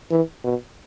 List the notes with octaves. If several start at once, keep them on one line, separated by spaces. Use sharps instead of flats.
E3
B2